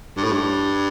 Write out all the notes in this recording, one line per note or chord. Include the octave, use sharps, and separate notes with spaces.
G2
A2
G2